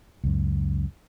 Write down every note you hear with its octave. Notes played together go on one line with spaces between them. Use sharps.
C#2 F#2